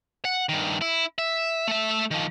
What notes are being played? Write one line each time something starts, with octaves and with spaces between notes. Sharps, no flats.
F#5
G2 D#3
E4
E5
A3 E5
D#3 F3